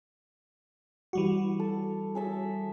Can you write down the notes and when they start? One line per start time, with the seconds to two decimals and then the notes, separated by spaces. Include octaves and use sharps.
1.13 E3 G3 F#4
1.59 A4
2.15 G#4 A4 E5